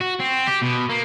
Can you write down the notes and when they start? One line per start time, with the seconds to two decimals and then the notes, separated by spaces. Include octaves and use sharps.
0.01 F#4
0.20 C4
0.48 G4
0.63 B2
0.89 A#3